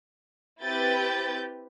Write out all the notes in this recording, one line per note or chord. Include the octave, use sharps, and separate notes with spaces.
C4 E4 G4 B4 G6 A6